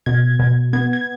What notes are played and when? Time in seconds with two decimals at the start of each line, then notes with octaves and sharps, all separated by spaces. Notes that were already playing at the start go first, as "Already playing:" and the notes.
0.06 B2 G#6
0.39 B2
0.73 B3 G#6
0.93 G#6